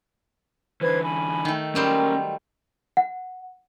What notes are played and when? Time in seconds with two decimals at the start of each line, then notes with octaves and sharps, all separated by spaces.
0.81 D3 E3 B4 C5 G#6
1.02 G#5 B5
1.45 D#3 A3
1.75 F#3 G3 C#4 A#4 C5 G5
2.97 F#5